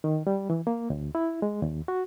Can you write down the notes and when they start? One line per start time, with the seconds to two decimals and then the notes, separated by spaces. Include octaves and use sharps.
0.04 D#3
0.27 G3
0.50 E3
0.67 A#3
0.90 D2
1.15 E4
1.42 G#3
1.62 D#2
1.88 F#4